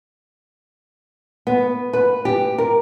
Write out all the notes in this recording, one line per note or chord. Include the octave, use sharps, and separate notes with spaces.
B3
B4
G4
A#4